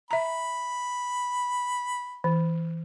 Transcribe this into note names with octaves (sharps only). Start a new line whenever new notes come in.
E5 A#5 B5
E3